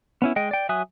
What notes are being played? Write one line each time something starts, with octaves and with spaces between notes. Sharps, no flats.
B3 C#4 E4
G#3 D#5 G5
D5 G5
F#3 E5 G#5 D#6 F#6